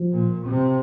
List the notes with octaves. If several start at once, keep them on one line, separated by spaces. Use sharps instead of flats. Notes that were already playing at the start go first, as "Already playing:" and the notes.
Already playing: F3
A#2
C3 C4